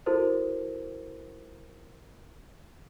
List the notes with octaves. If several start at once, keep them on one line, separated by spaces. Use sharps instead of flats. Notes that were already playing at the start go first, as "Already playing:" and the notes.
E4 F#4 A4 A#4 C5